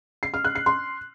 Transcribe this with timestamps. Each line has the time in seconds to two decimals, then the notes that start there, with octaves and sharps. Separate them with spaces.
0.23 C7
0.34 F6
0.44 F#6
0.55 C7
0.66 C6